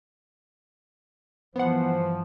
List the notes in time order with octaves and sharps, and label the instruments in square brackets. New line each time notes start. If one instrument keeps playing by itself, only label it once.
[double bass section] G2 E3 [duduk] F3 [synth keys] B3 F#5 [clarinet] C5